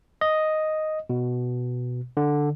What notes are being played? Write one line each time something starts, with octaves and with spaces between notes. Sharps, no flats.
D#5
B2
D3